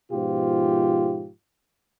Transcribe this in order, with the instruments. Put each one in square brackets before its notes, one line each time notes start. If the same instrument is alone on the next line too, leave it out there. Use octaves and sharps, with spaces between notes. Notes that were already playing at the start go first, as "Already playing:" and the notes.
[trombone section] G#2 B2 F3 F4 G4